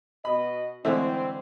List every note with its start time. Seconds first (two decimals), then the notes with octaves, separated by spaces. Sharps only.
0.25 B2 D#5 B5
0.85 A2 D3 E3 G#3 C4 C5 E5